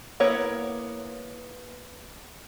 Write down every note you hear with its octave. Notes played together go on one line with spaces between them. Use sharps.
A#3 B3 E4 C#5